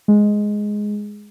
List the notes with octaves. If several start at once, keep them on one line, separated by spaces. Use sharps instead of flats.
G#3